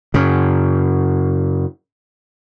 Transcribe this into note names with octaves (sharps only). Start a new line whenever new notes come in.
F#2 C#3